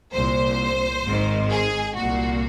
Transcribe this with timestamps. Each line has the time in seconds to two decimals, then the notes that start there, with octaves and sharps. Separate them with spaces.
0.13 C2 A#2 C5
1.04 G#1 G#2 D#3
1.50 G#4
1.95 C2 A#2 F#4